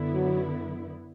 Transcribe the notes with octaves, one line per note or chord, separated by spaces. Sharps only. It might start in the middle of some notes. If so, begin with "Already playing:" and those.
Already playing: F#2 D3 B3 E4
F#3